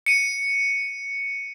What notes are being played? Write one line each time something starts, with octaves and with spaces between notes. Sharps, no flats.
C#7 D#7